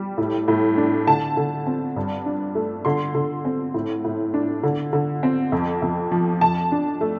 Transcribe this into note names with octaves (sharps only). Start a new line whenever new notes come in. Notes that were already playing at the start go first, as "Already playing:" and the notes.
Already playing: G3
A2
A2
D4
D3 A5
D3
C4
G2
D4
A3
D3 C6
D3
C4
A2
A2
D4
D3
D3
C4
F2
F2
F3
F2 A5
D4
A3